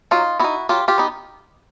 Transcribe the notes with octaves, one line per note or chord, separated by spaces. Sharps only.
F#3 D#4 F4
B3 D#4 E4 F#4
F#3 F4 G4
F4 G4
B3 D#4